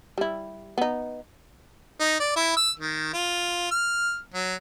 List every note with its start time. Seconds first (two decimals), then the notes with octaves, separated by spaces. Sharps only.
0.18 G3 E4
0.78 B3 D#4
2.00 D#4
2.20 D5
2.36 E4
2.56 E6
2.79 D#3
3.13 F4
3.71 F6
4.34 F#3